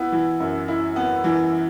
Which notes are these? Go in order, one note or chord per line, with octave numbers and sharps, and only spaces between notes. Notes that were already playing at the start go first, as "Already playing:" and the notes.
Already playing: B3 E4
E3
F#2
E4
B3
E3